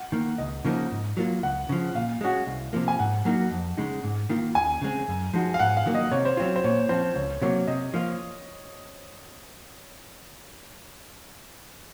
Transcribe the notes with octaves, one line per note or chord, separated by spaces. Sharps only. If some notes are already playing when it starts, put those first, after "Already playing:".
Already playing: F#5
D#3 A#3
C#2 D#5
C#3 F3 A#3 D#4
G#2
F#3 A#3 F4
C#2 F#5
C#3 F3
A#2 F5
G#3 C#4 F#4
C2
C3 F3 A#3
G#5
G#2 F#5
F#3 A#3 D#4 F#4
F2
C#3 G#3 D#4
G#2
D#3 A#3 F4
D#2 G#5
C#3 G#3 C4
F#2
F3 G#3 D#4 F#4
F5
G#2 F#5
F5
D#3 F#3 A#3
D#5
C3 C#5
C5
F#3 C4 F4 C#5
C5
A#2 C#5
F3 C4 C5
C#2 C#5
C3 F#3 A#3 C#5
C3 D#5
F3 A#3 F4